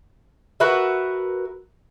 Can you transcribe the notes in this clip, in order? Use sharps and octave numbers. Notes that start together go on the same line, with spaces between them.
F#4 A#4 B4 E5